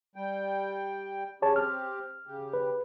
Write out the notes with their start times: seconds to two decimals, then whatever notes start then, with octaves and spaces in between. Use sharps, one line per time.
0.16 G3 G5
1.42 C#4 G4 G#4 C#5 A5
1.56 C4 G4 F6
2.27 C#3 G4
2.53 B4